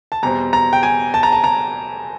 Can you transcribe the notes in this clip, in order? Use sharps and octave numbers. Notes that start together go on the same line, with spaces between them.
A5
E2 B2 G3 C4 A#5
A#5
G5
G#5
A5
A#5
A5
A#5